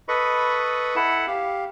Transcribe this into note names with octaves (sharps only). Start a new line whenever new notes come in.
A4 B4 D#5 B5 C#6
E4 A4 F#5 A5 B5
G4 F5